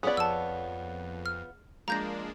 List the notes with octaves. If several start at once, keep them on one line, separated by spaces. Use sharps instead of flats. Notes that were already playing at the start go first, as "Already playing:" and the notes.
B3 F4 G#4 C#5 D5 F#5 B5
F2 A5 E6
F6
F3 G#3 A#3 D4 A#5 G6 A#6